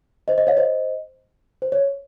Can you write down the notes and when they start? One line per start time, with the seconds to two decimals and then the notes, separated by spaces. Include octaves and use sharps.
0.28 C5 D#5
0.38 C5 D#5
0.47 C#5 F5
0.57 C5 D#5
1.62 C5
1.72 C#5